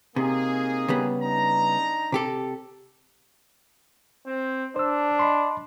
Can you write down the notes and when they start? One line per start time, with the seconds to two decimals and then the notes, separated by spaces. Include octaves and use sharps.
0.16 C3 A#3 D#4 G#4
0.88 C#3 G3 B3
1.22 D4 D#4 A#5
2.12 C3 G4 A4
4.27 C4
4.76 D4 C5 E6
5.19 D#5 B5 C6